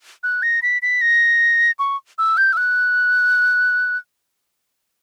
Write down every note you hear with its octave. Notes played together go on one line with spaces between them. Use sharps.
F#6
A#6
B6
B6
A#6
C#6
E6
G6
E6
F#6